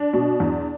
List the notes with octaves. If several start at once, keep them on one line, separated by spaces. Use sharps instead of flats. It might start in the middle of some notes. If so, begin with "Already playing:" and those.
Already playing: D4
B2
E2